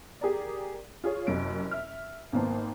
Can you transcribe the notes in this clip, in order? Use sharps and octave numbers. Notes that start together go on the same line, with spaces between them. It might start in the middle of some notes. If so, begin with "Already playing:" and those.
G4 G#4 A#4 D5
F4 G#4 C#5
F#1 F#2 C3 D7
E5 F6
G#1 D#3 A#3 B3 C5 A5